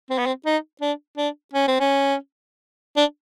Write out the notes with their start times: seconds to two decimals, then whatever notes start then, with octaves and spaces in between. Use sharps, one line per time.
0.10 C4
0.18 B3
0.26 C4
0.46 D#4
0.81 D4
1.17 D4
1.54 C#4
1.68 C4
1.80 C#4
2.97 D4